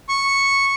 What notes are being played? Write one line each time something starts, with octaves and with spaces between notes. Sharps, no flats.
C#6